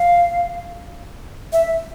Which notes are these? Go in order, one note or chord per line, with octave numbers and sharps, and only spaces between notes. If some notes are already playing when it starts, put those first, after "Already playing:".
Already playing: F5
E5